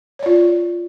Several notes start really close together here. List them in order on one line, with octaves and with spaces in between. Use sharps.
C#5 D5 F4